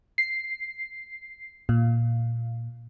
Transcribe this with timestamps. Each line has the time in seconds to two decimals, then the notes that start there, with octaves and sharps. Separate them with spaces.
0.18 C7
1.69 A#2